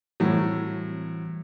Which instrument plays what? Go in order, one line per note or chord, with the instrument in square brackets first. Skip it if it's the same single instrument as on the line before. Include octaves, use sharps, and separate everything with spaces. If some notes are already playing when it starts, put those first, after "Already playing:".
[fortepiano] A2 F#3 [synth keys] E3 G3 C4